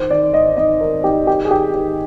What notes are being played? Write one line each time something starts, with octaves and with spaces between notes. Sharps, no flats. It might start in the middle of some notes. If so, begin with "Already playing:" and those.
Already playing: D#3 C5
D#3 D5
G#2 D#5
G#2 D#5
D#3 A#4
G#2 G4
D#3 G4
G#4
D#3 G4
D#3 G4